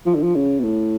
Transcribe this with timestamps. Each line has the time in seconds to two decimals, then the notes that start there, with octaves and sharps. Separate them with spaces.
0.06 F3
0.15 D3
0.22 F3
0.35 C#3
0.60 B2
0.64 A2